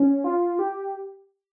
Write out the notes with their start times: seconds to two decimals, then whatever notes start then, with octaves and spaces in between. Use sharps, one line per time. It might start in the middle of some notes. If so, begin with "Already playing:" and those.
Already playing: C#4
0.24 F4
0.59 G4